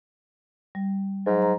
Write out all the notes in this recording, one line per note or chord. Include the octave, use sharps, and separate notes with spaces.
G3
G#2 F#3
A#5